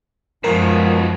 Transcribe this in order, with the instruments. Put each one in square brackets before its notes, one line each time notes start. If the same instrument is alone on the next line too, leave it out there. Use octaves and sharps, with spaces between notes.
[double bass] F#2 F3 [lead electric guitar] B2 D#3 [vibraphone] G#3 F5 [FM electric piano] A#4